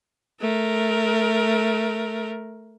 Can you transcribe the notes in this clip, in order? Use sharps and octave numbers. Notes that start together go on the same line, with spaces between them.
A3 A#4